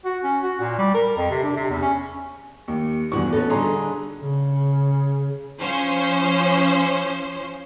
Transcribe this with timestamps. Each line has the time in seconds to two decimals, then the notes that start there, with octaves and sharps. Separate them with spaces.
0.05 F#4
0.24 C#4
0.43 F#4
0.61 A#2
0.79 G3
0.94 A#4
1.17 F2
1.31 C3
1.43 D4
1.56 C3
1.70 E2
1.82 C#4
2.68 D#2
3.12 E2 G2 D3 F#4 C#6
3.33 B3 C#4 D#4 F#4 A4
3.50 D3 G3 D#4 G#4 A#5 C6
4.20 C#3
5.60 F3 C#4 C5